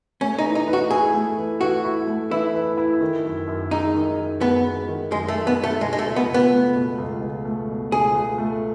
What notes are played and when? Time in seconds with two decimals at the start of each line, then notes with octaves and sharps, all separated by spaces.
0.21 A3 C#4
0.38 D#4
0.44 E3
0.55 D#4
0.68 B4
0.73 F#4
0.90 E4 G#4
1.14 A3
1.38 E3
1.61 F#4 B4
1.84 E4
2.07 A3
2.31 E3 E4
2.55 B4
2.78 E4
3.01 D#3
3.25 F#2
3.47 F#2
3.71 G#3 D#4
3.94 D#3
4.18 F#2
4.41 F#2 B3
4.64 G#3
4.88 D#3
5.12 F#2 G#3
5.28 A3
5.35 F#2
5.47 B3
5.58 G#3
5.64 A3
5.81 B2 G#3
5.93 G#3
5.99 A3
6.06 C#2
6.16 B3
6.28 C#2
6.34 B3
6.52 A3
6.75 B2
6.98 C#2
7.21 C#2
7.45 A3
7.69 B2
7.92 C#2 G#4
8.15 C#2
8.38 A3